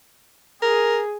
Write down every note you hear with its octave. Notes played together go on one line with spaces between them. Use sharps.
G#4 A#4